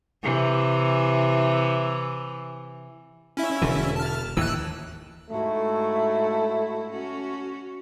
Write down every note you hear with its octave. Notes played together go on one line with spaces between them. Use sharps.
C3 E3
C#4 E4 E5
E1 D3 E3
A5 F6
D#2 A2 E3 E6 F#6
G#2 A3 E4 F#4
C#4 F#4